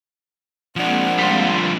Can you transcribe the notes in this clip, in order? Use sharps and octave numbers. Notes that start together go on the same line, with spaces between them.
F3 G#3 A#3 C4 D4 F#5
G3 F4